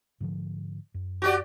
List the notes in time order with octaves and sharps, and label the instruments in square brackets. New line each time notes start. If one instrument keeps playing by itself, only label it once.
[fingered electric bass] G#2 D3 F3
F#2
[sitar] F#4 G4 D5